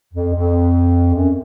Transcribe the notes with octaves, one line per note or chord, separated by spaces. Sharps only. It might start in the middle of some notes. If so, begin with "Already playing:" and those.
F2
F2
F#2